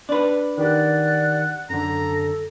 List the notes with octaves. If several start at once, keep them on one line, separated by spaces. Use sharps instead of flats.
D4 B4
D#3 G4 D5 F#5
F#2 D3 A4 A#5